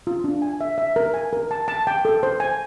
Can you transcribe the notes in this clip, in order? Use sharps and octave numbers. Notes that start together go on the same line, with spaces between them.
F4
D4
G#5
E5
E5
A#4
G#5
A#4
A5
A5
G5
A4
C5
G#5